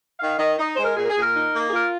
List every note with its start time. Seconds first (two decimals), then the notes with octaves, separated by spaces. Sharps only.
0.20 D#3 F5
0.38 D#3 D#5
0.58 D#4 D#5
0.76 G#3 C5
0.84 A#4
0.96 A#2 G#4
1.05 A#4
1.10 G#4
1.16 A#2
1.22 A#4
1.36 D#4
1.54 A#3
1.69 G#4
1.73 F4 A#4